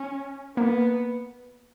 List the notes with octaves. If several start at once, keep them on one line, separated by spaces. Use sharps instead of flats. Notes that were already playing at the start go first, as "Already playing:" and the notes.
Already playing: C#4
A#3 B3